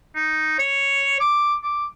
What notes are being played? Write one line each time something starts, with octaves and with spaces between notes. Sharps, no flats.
D#4
C#5
D6
D6